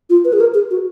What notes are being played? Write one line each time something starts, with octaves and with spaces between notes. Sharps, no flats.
F4
B4
G#4
A#4
G#4
F#4